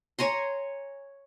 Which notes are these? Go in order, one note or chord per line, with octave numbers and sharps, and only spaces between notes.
C#5 G#5 A#5 C6